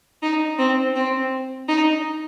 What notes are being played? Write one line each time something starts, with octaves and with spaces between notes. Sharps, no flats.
D#4
C4
C4
D#4